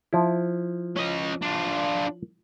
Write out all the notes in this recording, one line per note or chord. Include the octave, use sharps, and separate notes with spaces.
F3 E4
C#4 D#5
D4 F4